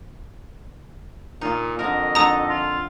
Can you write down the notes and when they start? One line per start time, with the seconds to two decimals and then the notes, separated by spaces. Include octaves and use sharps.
1.41 A#2 D#4 F4
1.79 F2 D3 A#4 D#5
2.15 D3 D#4 A4 A#5 D#6
2.49 F4